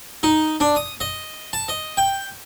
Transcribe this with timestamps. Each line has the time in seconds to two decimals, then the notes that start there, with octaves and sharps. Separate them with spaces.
0.23 D#4
0.60 D4
0.76 D#6
1.00 D#5
1.53 A5
1.68 D#5
1.97 G5